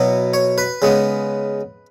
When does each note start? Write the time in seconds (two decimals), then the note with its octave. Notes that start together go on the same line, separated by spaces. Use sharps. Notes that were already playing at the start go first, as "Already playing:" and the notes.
Already playing: B2 F#3 B3 E4
0.34 C#5
0.58 B4
0.82 C#3 G#3 B3